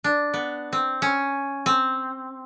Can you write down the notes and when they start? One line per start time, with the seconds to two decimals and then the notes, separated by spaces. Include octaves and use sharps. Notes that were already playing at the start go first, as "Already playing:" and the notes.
0.04 D4
0.34 B3
0.73 C4
1.02 C#4
1.66 C4